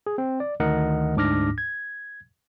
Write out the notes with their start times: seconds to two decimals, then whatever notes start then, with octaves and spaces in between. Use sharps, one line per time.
0.07 G#4
0.18 C4
0.40 D5
0.60 D2 D#3 A#4 D#5 F#5
1.16 D2 G#2 D4 D6 F6 A#6
1.58 G#6